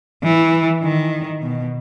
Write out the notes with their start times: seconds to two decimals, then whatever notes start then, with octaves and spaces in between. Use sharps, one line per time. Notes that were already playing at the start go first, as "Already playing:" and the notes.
0.23 E3
0.83 D#3
1.42 B2